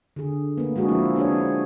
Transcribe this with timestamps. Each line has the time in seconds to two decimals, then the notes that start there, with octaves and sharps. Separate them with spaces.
0.16 D3 G#4
0.57 A#3 B3
0.76 G#3 D4 F#4 G#4
0.88 F3 G#3 A#3 C4 E4
1.16 B3 D4 G#4 C#5
1.31 C4